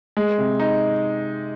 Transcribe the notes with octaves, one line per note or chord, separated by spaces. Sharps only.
G#3
C3
D#4